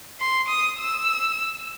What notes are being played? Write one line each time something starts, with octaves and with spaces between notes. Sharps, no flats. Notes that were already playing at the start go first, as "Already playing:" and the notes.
C6
D#6
E6